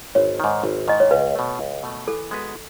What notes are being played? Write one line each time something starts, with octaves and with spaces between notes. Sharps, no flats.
G#1 C#5
G#2 D#3
G#1
G#2 D#3 D#5
C#5
C#2 B4
B2 A3
C#2
B2 A3
E3 A4
G#3 B3 F#4 B4